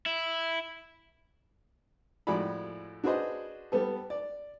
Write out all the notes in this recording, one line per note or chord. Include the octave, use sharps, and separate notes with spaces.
E4
F2 A2 G#3 F#4 D5 B5
D4 F#4 G#4 B4 C5 D#5
G3 B3 A4
D5